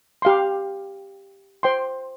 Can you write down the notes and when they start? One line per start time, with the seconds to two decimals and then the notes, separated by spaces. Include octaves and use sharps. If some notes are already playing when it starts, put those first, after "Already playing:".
0.22 G4 F5 C6
1.63 C5 G5 C6